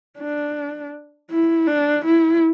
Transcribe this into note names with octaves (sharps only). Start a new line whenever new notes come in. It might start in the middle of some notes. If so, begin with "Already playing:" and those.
D4
E4
D4
E4